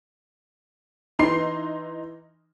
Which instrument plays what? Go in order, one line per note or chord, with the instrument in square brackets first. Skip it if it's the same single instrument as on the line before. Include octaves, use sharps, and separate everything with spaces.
[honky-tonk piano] E3 D#4 C6 C7